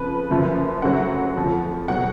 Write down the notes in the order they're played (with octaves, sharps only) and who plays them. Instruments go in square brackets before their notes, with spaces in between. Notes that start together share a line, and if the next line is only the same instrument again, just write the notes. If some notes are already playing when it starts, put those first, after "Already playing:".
Already playing: [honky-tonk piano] F2 C#3 F3 B4
F#1 F#2 F3
D2 C#3 F#3 F#5
F2 F3
B2 F#3 F#5